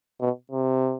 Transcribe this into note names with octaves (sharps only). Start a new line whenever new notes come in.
B2
C3